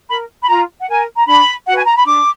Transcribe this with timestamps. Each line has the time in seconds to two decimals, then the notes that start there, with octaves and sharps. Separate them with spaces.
0.10 A#4 B5
0.44 B5
0.49 F4 A#5
0.80 F#5
0.89 A#4 G#5
1.17 A#5
1.27 D4 B5
1.67 F#4 F#5
1.72 B4
1.77 G#5
1.86 A#5
1.96 B5
2.06 D4 D6